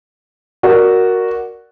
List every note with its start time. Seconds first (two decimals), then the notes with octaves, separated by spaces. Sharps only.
0.63 F#4 A#4 D5